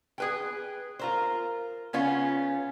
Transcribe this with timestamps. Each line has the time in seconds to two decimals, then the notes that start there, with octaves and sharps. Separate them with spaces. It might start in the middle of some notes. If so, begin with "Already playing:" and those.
0.18 G#4 B4 G5
0.99 F4 A#4 C5
1.93 C#3 B3 C#4 F4